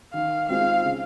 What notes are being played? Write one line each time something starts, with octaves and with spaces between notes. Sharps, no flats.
D#3 F5
G#3 C4 F4 G#4 F5
C#3